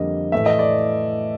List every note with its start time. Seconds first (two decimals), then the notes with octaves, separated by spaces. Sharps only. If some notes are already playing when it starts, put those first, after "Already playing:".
Already playing: F2 D3 G3 A#3 D#5
0.32 A2 E3 A3 E5
0.46 D#5
0.59 D5